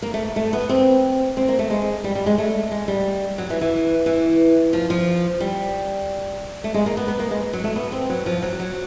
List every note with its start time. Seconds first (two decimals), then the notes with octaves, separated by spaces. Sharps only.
0.02 A#3
0.14 A3
0.36 A3
0.53 B3
0.69 C4
1.37 C4
1.48 A#3
1.59 A3
1.70 G#3
2.04 G3
2.15 G3
2.26 G#3
2.38 A3
2.71 G#3
2.88 G3
3.38 F#3
3.50 E3
3.61 E3
4.06 E3
4.73 F3
4.90 F3
5.40 G3
6.64 A3
6.74 G#3
6.86 A#3
6.97 B3
7.08 B3
7.19 A#3
7.31 G#3
7.53 F#3
7.64 A3
7.76 B3
7.92 C4
8.10 F#3
8.26 F3
8.42 F#3
8.60 F#3